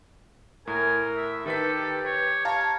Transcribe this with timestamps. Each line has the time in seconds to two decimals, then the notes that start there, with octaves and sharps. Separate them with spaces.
0.67 A2 A#4 G#5
1.17 E5
1.46 D#3 G4 A4 B4 B6
2.04 B4 C#5
2.45 C#5 F5 A5 A#5